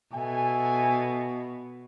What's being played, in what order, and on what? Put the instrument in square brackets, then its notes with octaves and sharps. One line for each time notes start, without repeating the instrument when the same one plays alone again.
[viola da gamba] B2 [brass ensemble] A4 E5 G#5